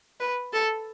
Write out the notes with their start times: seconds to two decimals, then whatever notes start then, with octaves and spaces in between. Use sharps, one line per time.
0.20 B4
0.53 A4